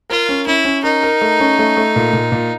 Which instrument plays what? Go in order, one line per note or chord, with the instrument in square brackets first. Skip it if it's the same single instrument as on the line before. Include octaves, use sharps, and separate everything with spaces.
[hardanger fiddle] F4 [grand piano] A#4
[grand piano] C#4
[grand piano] C#4 [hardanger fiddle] E4
[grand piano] C#4
[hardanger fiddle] D#4 [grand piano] A#4
[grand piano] A#4
A3
C#4
A3
A3
A#2
A#2
A#2